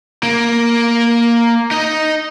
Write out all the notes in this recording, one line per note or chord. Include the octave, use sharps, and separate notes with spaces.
A#3
D#4 D#5